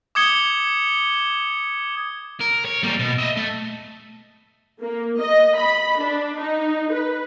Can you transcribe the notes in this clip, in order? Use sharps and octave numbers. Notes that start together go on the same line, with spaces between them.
D6 D#6 G#6 C#7 G7
A#4
C#5
G3 A#3
B2
D#5 E5
A3
A#3
D#5
B5
D4
D#4
B4